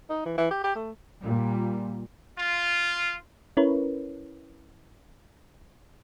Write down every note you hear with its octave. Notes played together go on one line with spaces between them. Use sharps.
D#4
E3
E3
G4
G4
A3
A#2 G3
F4
C#4 E4 A#4 B4 C#5